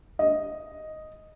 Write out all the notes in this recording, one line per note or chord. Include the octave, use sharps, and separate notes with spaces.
D#5